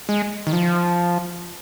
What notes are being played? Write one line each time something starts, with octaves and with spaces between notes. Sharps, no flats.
G#3
D#3
F3